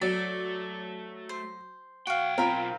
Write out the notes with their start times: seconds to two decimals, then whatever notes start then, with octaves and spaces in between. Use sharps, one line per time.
0.02 F#3 A3 D5
1.29 C5
2.07 B1 F#4 F5 G5
2.38 C4 F4 A#4 B5